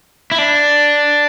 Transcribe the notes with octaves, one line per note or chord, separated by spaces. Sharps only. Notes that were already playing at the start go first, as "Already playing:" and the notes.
E4
D4